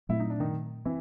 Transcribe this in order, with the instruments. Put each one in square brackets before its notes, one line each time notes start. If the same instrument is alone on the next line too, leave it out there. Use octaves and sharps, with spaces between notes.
[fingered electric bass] A#2 F#3 A3 C4 [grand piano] E4
[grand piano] D#4
D4
D#3 D#4
[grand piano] E3 E4 [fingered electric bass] C4